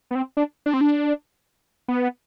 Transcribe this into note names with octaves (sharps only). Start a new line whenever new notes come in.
B3
C4
D4
D4
C4
D4
B3